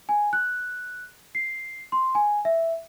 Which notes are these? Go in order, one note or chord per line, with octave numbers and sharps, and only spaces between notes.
G#5
F#6
C7
C6
G#5
E5